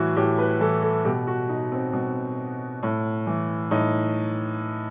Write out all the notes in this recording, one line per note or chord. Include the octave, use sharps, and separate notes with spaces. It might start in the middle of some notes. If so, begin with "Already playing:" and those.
Already playing: A2 E3 E4 F#4
A2 G4
B4
E3 A4
A4
B2 G4
F#4
D#4
C4
B2
A2
E3
A2 D#4